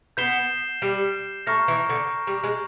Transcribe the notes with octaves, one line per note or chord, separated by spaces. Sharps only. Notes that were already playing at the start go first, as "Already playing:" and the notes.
B3 G6 C7 E7 G7
G3
A3 A#5 C#6 F6 A#6
E3
D3
G3
G#3